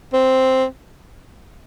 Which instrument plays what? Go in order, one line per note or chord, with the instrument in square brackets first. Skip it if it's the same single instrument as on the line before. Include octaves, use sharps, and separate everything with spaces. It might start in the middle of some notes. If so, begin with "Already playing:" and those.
[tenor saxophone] C4